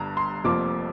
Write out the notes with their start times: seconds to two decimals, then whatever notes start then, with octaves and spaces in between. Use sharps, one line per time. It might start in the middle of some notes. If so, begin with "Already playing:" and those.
Already playing: G1 G2 A#5
0.17 C6
0.44 F1 F2 F3 A#3 D6